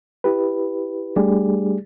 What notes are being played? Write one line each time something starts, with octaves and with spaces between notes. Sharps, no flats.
E4 G4 B4
G3 A3 D4 G4 G#4 D5